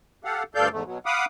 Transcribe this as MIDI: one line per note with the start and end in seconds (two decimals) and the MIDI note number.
0.24 0.43 67
0.24 0.43 69
0.24 0.43 77
0.24 0.43 78
0.55 0.69 38
0.55 0.69 43
0.55 0.69 69
0.55 0.69 74
0.55 0.69 77
0.55 0.69 91
0.72 0.83 40
0.72 0.83 44
0.72 0.83 57
0.86 0.98 47
0.86 0.98 54
1.06 1.25 77
1.06 1.25 78
1.06 1.25 83
1.06 1.25 86
1.06 1.25 87